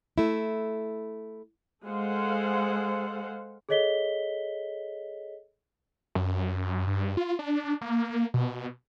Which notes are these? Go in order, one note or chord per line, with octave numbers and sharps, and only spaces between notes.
A3 E4
G#3 A4 C5 F5 F#5
G#4 A4 C#5 D#5 B6 G7
F#2
G2
F4
D4
A#3
B2